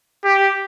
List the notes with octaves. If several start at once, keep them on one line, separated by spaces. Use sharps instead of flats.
G4